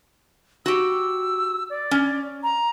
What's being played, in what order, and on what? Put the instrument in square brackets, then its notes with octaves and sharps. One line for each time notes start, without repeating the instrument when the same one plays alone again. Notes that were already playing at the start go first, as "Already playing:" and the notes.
[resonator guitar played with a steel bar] F#4 G4 [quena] E6
[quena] D5
[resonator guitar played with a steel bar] C#4
[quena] A#5